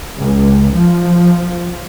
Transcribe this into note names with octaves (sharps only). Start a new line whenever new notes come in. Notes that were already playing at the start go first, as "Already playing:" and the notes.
C#2
F3